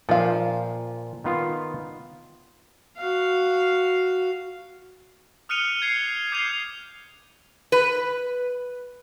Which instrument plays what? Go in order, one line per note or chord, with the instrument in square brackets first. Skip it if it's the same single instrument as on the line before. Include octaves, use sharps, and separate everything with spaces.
[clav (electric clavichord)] A#2 G5 [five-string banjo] F3 F5
[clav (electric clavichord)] D#3 B3 F4
[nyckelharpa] F#4 F5
[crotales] D#6 F6 F#6 C#7 D#7 F7
G#6 C7 C#7
D6 G6 G#6 C7 D#7 F7
[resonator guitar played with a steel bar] B4